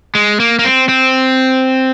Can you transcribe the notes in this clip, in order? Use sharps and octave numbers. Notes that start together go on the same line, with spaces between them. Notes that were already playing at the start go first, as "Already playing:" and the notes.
G#3
A#3
A#3
C4
C4